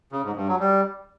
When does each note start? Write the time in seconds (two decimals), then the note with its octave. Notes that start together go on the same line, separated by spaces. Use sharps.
0.12 C#3
0.24 G#2
0.36 G2
0.48 F#3
0.60 G3